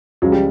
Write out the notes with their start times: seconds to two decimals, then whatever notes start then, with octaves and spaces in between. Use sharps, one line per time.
0.22 C#2 C#3 F3 F#3 G#3
0.32 G3